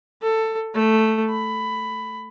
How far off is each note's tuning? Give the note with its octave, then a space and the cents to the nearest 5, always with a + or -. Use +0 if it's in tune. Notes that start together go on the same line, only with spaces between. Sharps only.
A4 +15
A3 +0
B5 +10